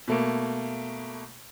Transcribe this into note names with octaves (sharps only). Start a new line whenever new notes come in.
B2 A3 A#3